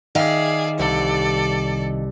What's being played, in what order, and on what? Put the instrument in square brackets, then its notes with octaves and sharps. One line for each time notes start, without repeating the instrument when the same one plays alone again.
[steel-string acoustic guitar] D#3 E5 F5 [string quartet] G#4 D5
[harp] C2 [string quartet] A4 D5